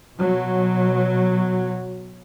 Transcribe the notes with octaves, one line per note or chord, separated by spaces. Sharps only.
B2 F#3